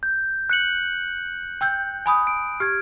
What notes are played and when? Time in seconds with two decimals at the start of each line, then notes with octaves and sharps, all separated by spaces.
0.03 G6
0.50 F#6 C#7 F#7
1.61 G5 E6 G6
2.06 G#5 B5 D#6
2.27 D7
2.60 G4 F6 G#6